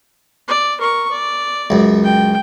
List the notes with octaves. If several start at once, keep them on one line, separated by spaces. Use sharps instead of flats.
D5
A#4 C#6
D5
C#2 F#2
G5